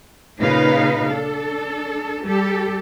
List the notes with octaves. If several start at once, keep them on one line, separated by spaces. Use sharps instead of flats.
A#2 C#3 D#4 B4 F5
D4 A4
G3 G4 A4